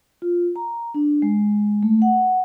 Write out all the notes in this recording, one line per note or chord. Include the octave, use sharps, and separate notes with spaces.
F4
A#5
D4
G#3
A3
F#5